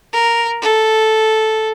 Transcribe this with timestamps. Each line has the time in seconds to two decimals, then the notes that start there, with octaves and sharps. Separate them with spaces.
0.13 A#4
0.62 A4